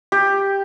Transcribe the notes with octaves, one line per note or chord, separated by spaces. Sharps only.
G4